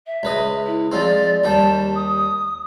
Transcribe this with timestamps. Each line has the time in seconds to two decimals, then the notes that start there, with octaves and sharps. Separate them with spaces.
0.06 E5
0.23 C#2 B4 D#5
0.66 E4
0.92 F3 G#3 C4 D5
1.44 D#2 G3 G5 A5
1.95 D#6